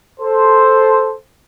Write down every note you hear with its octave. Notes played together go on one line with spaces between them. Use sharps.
A4 C5